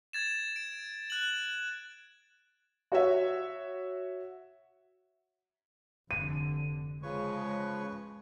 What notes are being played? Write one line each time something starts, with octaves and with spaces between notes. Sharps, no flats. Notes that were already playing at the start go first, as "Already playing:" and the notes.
G#6 A6 E7
D7
F#6 F#7
F#4 C#5 E5
F1 D3 D#7
C#3 F3 G#3 B4 C#5 C#6